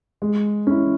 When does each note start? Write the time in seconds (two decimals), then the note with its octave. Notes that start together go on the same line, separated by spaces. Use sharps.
0.22 G#3
0.67 C#4 E4